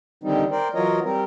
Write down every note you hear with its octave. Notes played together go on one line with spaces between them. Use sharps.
D3 D#3 G3 C4 D#4
A#4 C5 D5 G5
E3 F#3 F4 A#4 C#5 D#5
G3 C4 A#4